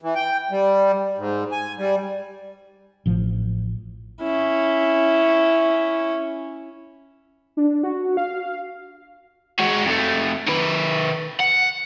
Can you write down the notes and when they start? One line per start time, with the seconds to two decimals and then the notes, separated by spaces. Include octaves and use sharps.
0.02 E3
0.15 G5
0.51 G3
1.18 G#2
1.52 G#5
1.78 G3
3.06 A1 F3
4.21 C#4 E4
7.57 D4
7.83 F#4
8.17 F5
9.59 G#3 F#4
9.86 F2 A3
10.48 D#3 B4
11.40 F#5